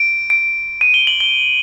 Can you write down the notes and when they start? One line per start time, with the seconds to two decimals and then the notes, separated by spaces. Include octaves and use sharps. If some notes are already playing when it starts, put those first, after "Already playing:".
Already playing: D7
0.30 D7
0.81 D#7
0.94 G7
1.07 F#7
1.20 G7